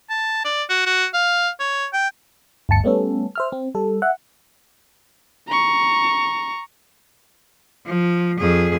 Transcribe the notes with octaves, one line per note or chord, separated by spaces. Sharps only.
A5
D5
F#4
F#4
F5
C#5
G5
G1 D2 A5 C#7
G3 A3 B3 C#4 A4
C5 E5 F6
C4
G3 A4
E5 F#5
A#5 C#6
F3
F2 G#4